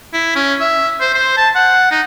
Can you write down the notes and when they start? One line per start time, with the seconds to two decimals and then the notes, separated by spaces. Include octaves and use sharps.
0.13 E4
0.35 C#4
0.60 E5
1.00 C5
1.14 C5
1.37 A5
1.55 F#5
1.91 D#4